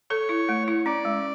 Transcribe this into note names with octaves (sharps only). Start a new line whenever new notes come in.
A4 C#5
E4
A3
E4
C#4 D5
G#3